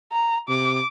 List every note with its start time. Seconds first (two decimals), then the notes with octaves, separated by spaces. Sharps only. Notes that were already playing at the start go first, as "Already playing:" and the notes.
0.12 A#5
0.49 C3 D6